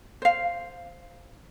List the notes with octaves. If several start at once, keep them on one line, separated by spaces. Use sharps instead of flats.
C5 F5